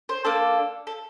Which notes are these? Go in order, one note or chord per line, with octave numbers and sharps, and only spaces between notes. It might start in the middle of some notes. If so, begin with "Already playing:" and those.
C5
A#3 D4 A4
A4